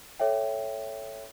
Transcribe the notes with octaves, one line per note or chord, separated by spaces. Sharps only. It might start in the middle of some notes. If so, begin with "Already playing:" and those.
A4 C#5 E5 G5